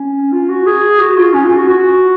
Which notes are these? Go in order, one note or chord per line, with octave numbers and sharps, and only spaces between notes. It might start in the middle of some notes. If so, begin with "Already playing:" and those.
Already playing: C#4
F4
F#4
G#4
F#4
F4
C#4
F4
F#4
F#4